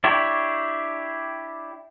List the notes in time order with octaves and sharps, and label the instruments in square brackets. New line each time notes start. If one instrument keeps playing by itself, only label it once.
[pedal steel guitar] D4 E4 G4 C#5